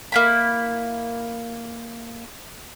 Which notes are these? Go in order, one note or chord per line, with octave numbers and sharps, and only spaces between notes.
A#3 E4 B5